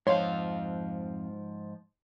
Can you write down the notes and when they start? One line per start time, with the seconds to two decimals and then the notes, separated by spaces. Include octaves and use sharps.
0.07 F2 G#2 F3 C#5 F5 C6